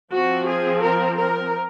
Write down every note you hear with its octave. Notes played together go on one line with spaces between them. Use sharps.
F3 C4 F#4
G#4
A#4
A#4